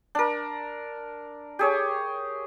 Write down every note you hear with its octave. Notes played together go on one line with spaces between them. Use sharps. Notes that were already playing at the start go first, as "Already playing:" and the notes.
D4 A#4
G4 G#4 C#5